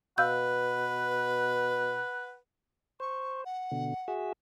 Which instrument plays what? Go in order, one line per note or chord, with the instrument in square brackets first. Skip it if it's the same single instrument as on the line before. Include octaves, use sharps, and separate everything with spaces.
[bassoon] B2 [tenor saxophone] B4 [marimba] F5 E6 G6 [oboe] F#5
[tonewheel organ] C5 [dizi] C#6
[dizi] F#5
[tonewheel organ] B2 D3
F#4 G#4 E5